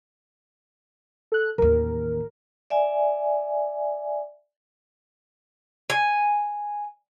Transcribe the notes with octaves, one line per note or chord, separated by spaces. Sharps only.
A4 F#6
A1 D#2 A#4
D5 E5 G#5
G#5